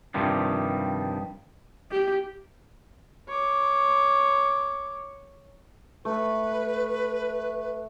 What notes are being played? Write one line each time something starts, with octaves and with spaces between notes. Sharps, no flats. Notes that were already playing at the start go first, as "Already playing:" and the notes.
G2 C3 D#3 F3 G3
G4
C#5 D6
A3 B4